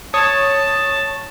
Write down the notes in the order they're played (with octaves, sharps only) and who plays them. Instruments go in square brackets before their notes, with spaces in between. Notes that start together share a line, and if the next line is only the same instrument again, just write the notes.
[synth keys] C#5 [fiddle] A5 [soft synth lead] D#6